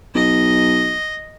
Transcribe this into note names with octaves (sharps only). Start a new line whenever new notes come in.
B1 D#5